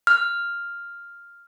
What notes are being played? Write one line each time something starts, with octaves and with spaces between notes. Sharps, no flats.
F6